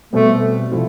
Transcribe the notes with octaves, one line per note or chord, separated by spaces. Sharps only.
B2 G3 A3 C4
C3 F3 C4 E4